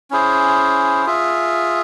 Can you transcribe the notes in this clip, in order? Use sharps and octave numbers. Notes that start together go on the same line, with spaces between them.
C#4 E4 G#4 C5
F4 G#4 E5